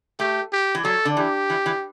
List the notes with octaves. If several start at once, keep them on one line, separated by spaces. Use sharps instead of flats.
A3 G4
G4
E3
F#3 A4
D3
E3 G4
E3
E3